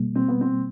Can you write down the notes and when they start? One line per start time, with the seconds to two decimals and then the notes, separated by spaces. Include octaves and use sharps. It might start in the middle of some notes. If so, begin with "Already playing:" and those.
Already playing: B2 G3 A#3
0.15 C4
0.28 B3
0.41 C4